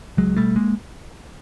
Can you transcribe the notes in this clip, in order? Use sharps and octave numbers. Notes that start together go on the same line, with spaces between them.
C#2 F#3 G#3
B2 G3 A3
G#3 A#3